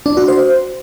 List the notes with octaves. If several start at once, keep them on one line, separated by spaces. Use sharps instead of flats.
D4
F#4
C5